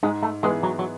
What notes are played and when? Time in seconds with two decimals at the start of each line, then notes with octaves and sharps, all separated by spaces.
0.03 G#2 G#3
0.23 A3
0.43 E3 G#3 B3 E4 G#4
0.63 F#3
0.79 F#3